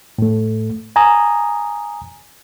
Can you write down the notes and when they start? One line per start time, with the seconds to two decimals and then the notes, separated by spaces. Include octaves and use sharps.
0.18 A2 A3
0.96 G#5 A#5 D#6